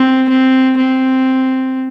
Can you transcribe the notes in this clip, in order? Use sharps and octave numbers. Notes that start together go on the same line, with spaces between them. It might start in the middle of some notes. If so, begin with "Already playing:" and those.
Already playing: C4
C4
C4